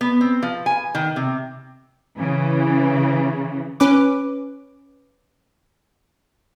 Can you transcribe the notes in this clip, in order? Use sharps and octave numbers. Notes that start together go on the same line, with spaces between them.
B3
C4
F3
G#5
D#3
C3
C#3 E3
C#4 B4 D6